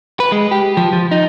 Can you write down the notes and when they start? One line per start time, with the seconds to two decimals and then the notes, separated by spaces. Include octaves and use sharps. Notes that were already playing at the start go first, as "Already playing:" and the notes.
0.20 B4
0.32 G#3
0.51 G4
0.77 F3
0.93 F3
1.11 D#4